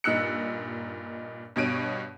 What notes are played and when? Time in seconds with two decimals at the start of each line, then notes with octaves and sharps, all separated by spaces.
0.04 G2 A#2 D#4 E6 F#6 C#7
1.56 G2 B2 C#5 D7 D#7